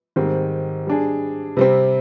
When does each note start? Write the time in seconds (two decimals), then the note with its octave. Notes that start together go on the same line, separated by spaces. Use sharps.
0.16 G#2 D#3 G3 C4
0.87 G3 D4 G#4
1.57 C3 G3 C4